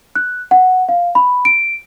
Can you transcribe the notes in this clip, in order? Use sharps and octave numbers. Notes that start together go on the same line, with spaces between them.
F#6
F#5
F5
B5
D7